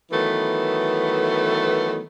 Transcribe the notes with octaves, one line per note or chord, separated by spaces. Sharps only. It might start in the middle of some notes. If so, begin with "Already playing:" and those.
D#3 E3 F#3 A3 B3